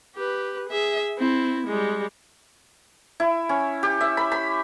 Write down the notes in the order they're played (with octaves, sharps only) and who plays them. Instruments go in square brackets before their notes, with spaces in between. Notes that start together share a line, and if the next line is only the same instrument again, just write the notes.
[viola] G4 B4
G#4 E5
C4 E4
G3 G#3
[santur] E4
C#4
G4
E5
B5
B5